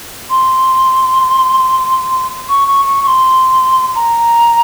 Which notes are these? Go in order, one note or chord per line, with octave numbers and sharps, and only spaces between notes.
C6
C#6
C#6
C#6
C#6
C6
A#5